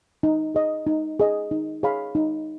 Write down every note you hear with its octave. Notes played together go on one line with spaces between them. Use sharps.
D#4
G#4 D#5
D#4
G#4 D#5
D#4
G#4 C#5 F5 B5
D#4